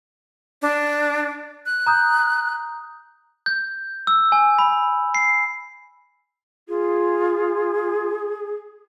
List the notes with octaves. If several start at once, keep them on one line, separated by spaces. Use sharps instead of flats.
D4
F#6
A#5 D#6 G6
G6
E6
G#5
B5
C7
F4 G#4